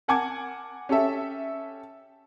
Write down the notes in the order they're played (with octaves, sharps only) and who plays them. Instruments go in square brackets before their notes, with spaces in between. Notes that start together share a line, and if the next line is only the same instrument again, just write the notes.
[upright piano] A#4 F#5 G#5 A5 D6 G#6
C#4 G4 A4 E5